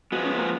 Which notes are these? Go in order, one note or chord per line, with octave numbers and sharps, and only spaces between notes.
F3 G#3 B3 F#4
C#4
A#3